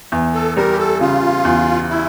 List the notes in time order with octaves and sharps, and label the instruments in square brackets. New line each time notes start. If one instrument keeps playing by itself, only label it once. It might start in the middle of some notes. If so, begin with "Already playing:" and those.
[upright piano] E2
[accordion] A4
[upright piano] G3 [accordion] A#4
[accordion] G4
A4
[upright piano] C#3 [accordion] F4
[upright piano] E2
[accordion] E4